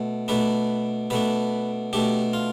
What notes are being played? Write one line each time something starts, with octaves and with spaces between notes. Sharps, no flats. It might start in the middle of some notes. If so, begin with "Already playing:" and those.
Already playing: B2 A3
B2 A3 D4 B4
B2 A3 D4 B4
B2 A3 D4 G4
F4